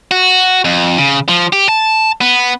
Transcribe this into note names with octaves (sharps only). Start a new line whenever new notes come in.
F#4
F2
C#3
F3
G4
A5
B3